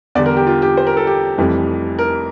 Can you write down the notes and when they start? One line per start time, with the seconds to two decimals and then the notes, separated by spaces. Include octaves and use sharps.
0.15 E2 D3 G3 D5
0.26 A#4
0.37 G4
0.47 F4
0.62 G4
0.77 C5
0.87 A#4
0.97 A4
1.07 G4
1.38 F1 F2 E3 G3
1.99 A#4